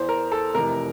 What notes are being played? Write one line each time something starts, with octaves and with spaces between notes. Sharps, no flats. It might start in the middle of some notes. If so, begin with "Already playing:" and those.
Already playing: E2 E3 C5
A#4
A4
F1 F2 C3 E3 A#4